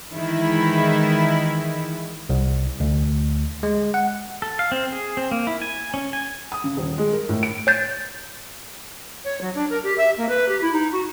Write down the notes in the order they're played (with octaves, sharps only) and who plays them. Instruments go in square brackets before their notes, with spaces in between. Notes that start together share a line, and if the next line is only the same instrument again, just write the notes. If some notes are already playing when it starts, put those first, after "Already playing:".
[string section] D#3 E3 G#3 E4
[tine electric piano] C2
D2
G#3
F#5
[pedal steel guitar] A4
F5
C4
G#4
C4
A#3
E4
G#5
C#4
G#5
[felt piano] D#6
C#3
D#1
G#3
A#4
A2
D7
[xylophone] C#5 G6 A6
[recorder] C#5
F#3
D4
A#4
G4
E5
A#3
B4
G4
E4
D#4
F#4